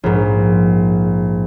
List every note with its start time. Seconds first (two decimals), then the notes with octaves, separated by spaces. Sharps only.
0.04 A#1 G#2